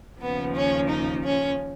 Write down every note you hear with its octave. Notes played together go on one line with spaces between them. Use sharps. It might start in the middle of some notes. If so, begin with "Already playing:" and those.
D#2 C#3 F3 B3
C#4
D#4
C#4